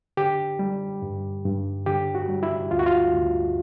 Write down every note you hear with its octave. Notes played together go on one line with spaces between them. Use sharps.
D3 G4
G3
G2
G2
D3 G4
F#4
G3
E4
D2 F4
F#4
F4
D2